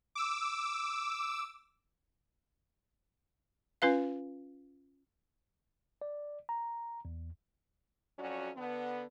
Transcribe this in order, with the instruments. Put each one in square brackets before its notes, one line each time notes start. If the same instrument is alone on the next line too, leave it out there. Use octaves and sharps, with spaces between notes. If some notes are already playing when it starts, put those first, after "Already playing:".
[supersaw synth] D6 E6
[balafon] C#4 F4 B4 F5
[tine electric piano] D5
A#5
E2
[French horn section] F2 F#3 C#4 F#4 D5
D3 B3